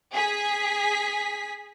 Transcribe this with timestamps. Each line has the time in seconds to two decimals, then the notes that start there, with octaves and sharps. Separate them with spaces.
0.14 G#4 B6